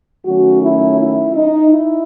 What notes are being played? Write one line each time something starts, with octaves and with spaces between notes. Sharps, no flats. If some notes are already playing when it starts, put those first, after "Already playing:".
D#3 F#3 A3 C#4 F#4
E4
E4
D#4
E4